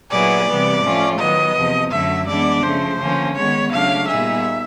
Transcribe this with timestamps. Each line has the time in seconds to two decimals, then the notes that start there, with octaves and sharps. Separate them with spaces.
0.11 A#2 F#3 B3 E4 G#4 D5
0.46 C3 E3 G3 B3
0.83 A2 F3 A3 C#4 F4
1.19 D#3 F#3 B3 D#5
1.55 E2 C3 F3
1.91 F#2 D3 F#3 A3 E5
2.27 E3 G#3 B3 D4 D5
2.63 C#3 F3 A3 C5
2.99 D3 F3 A#3 C#4
3.35 D#3 G#3 B3 C#5
3.71 C#3 F#3 A3 D4 F5
4.07 A#2 G3 B3 D#4 G#4 E5